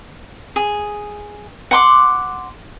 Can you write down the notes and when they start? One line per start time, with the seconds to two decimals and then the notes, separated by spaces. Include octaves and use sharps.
0.56 G#4
1.71 F#5 C6 D6